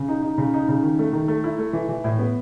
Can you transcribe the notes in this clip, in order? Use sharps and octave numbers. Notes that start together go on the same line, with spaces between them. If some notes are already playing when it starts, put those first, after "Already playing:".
Already playing: C#3
D#4
D#4
C#3
D#4
C#3
D#3
A3
D#3
A3
E4
A3
E3
E3
A2
B3